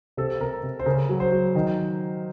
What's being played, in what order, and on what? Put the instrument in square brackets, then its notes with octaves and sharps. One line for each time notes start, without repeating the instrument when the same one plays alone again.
[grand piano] C3 A4
C3 A#4
C3
C5
C#3 A#4
F#3
C5
F#3
D#3